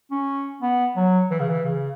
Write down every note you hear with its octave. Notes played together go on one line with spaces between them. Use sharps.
C#4
B3
F#3
E3
C#3
E3
C#3